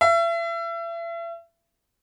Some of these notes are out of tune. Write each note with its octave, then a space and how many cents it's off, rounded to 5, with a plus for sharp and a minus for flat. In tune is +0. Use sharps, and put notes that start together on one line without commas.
E5 +35